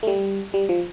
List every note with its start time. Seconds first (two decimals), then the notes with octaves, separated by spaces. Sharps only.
0.03 A3
0.07 G3
0.54 G3
0.69 F3